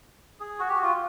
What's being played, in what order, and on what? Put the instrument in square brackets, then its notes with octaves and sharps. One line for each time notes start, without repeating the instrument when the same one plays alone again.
[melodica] G#4
F#4
G4
F#4
F4